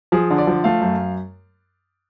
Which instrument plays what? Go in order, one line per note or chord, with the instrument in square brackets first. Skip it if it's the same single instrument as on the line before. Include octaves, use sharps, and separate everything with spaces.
[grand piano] F3 G#4
D3
D5
F3
A3 F5
F#2